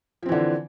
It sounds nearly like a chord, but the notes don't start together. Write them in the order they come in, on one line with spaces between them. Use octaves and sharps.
F3 C4 E3 D3